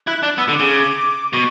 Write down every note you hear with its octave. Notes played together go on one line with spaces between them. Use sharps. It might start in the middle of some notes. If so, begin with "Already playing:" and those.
E4 F#6
D4 F#6
B3 E6
D3
D6
C#3
B2 C#6